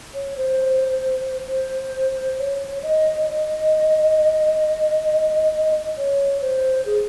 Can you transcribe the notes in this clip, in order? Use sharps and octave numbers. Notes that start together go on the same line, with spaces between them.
C#5
C5
C5
C#5
D#5
D#5
C#5
C5
G#4